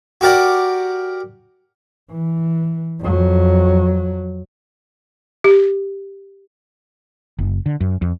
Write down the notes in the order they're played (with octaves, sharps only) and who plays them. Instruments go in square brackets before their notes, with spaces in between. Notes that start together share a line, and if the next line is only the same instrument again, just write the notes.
[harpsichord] F#4 G4 A#4 D5 F#5
[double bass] E3
F2 F#3
[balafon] G4
[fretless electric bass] F#1
D3
F#2
F2